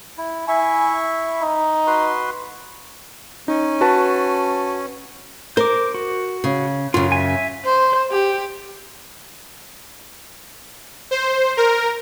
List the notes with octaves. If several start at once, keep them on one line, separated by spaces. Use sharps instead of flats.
E4
E4 E5 G#5 C#6
D#4
F#4 B4 C6
C#4 D#4
F#4 B4 A5
A#4 C5 D6
F#4
C#3
F#2 C#3 F4
E5 G#5
C5
G4
C5
A#4